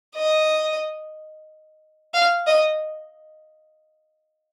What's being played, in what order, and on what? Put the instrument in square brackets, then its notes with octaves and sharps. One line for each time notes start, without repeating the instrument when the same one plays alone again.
[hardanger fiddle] D#5
F5
D#5